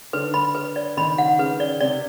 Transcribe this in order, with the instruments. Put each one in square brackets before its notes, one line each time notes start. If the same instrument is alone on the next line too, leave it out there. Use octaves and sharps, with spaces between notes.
[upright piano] D3 [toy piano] B4
[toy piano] B5
B4
D5
[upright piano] D#3 [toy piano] B5
[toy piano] F#5
[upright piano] C#3 [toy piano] B4
[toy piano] D5
[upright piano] C3 [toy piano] D5